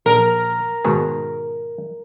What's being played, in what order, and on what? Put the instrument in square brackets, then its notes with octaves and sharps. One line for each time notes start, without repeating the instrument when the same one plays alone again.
[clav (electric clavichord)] A#1 [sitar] A#4
[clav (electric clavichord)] G#2 B2 D#3